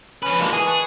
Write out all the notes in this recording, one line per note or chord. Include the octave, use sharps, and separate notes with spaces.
F3 C#4 B4
G#3 A#3 D4 F#4 G4
E3 G#4 D#6
B4 A5 C#6